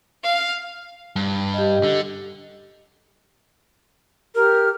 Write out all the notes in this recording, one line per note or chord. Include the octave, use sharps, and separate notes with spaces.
F5
G2
G4 D#5
D3
G4 A#4 F6